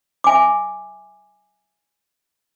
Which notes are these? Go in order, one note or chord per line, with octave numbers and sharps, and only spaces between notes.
E5 G#5 D6